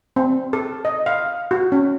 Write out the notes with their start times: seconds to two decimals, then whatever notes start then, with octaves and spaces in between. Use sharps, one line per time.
0.16 C4
0.53 A4
0.85 D#5
1.06 F5
1.51 F#4
1.72 C#4